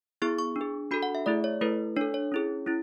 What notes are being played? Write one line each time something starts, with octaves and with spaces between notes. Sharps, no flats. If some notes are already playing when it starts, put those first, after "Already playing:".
B3 E4 G#4 C#6
C#6
D4
G#4
D4 F#4 A4 B5
F#5
E5
A3 E4 G#4 D5
C#5
A3 E4 A4 B4
D4 A4 C#5
C#5
C#4 E4 G#4
C#4 E4